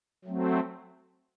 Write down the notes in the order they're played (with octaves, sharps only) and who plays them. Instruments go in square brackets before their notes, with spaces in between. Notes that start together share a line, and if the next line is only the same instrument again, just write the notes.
[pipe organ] F#3 A3 C4